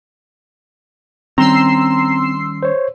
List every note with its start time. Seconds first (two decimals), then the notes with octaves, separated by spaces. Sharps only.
1.38 D#3 G3 C4 C#4 A#5 C6 E6 C7
2.63 C5 C#5